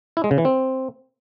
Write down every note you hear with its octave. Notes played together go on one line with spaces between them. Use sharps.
E4
G#3
C#3
E3
C4